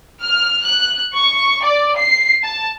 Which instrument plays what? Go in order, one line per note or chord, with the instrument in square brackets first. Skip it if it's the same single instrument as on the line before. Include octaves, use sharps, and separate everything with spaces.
[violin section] F6
F#6
C#6
D5
C7
A5